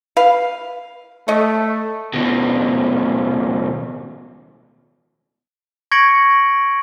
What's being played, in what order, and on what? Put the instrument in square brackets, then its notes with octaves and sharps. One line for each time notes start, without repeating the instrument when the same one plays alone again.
[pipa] B4 F5
[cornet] A3 [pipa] C#5 D#5
[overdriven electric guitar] D#2 B2
[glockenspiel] C#6 G#6 A#6 C#7 D7 F#7